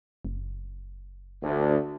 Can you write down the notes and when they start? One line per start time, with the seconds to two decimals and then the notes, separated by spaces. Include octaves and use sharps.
0.25 F#1
1.43 D2